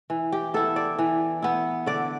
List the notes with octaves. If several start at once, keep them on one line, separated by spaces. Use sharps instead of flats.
E3
G4
B3 E4 A4
D5
E3
B3 E4
D3 D5